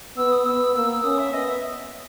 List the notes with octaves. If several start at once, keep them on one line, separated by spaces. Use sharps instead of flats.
B3 E6
D#6
B3 E6
A#3 E6
C#4 D#6
E5
B3 D#5
E5